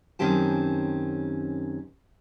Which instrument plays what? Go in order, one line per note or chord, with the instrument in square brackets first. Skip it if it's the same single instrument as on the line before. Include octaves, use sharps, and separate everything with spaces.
[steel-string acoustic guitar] F#2 D#3 C4 C#4 G4 A5